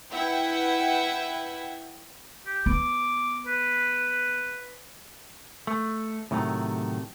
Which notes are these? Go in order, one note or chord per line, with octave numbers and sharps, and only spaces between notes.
E4 B4 E5 F#5 G5
G4
B3 D6
B4
A3
A2 C3 D#3 F#3 A3